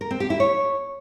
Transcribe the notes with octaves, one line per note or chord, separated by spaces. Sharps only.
A#4
C4
G4
E4
C#5